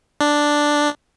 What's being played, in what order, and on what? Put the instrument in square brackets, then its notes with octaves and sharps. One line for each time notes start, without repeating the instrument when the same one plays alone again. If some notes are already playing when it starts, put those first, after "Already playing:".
[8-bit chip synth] D4